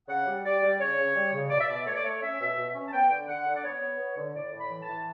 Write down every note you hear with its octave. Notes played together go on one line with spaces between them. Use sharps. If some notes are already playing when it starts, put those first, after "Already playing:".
C#3 F#5
G3
G3 D5
G3
C#3 C#5
C#3
G3
C#3
B2 D5
E5
B2 D5
A3 C#5
D5
A3 C#5
C#4 E5
B2
B2
C#4
A5
B3 G5
D3
D3 F#5
D3
D5
B3 C#5
B3
B3
D3
A2 D5
A2
B5
E3
A5
E3